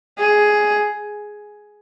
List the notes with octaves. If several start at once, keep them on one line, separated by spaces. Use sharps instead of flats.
G#4